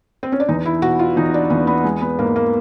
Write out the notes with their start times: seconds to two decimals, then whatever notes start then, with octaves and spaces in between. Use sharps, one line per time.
0.23 C4
0.32 C#4
0.40 D4
0.48 E2 D#4
0.65 E4
0.82 B2 F#4
0.99 F4
1.16 E2 D#4
1.34 D4
1.50 E2 B3
1.67 B3
1.84 G#3
2.01 B3
2.19 G#2 A#3
2.36 A#3